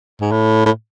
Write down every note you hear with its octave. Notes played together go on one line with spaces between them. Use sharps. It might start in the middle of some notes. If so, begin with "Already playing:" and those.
G#2
A2
A2